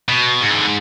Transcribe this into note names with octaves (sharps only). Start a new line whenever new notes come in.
B2
G#2
E3
D3